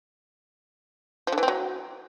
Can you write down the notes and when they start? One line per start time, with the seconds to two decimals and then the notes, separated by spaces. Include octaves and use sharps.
1.27 F3
1.32 D3
1.38 E3
1.43 C4
1.48 F#3